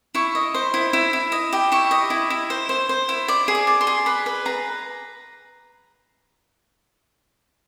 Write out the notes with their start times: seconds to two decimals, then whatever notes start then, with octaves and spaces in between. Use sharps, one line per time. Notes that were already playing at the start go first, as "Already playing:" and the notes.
0.15 E4 C#6
0.35 D#5
0.54 C5
0.74 E4
0.93 E4
1.13 E4
1.32 D#5
1.53 G4
1.72 E4 C#6
1.91 D#5
2.10 E4
2.30 E4
2.50 C5
2.69 C5
2.89 C5
3.09 E4
3.28 D5 D6
3.48 G#4
3.55 D6
3.67 D5
3.81 C6
3.87 G#4
4.06 B4 B5
4.26 B4
4.45 G#4 A#5